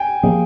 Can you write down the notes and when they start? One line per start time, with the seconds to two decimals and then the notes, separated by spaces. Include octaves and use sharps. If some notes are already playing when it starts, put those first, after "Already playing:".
Already playing: G5 G#5
0.23 F3 A#3 G#4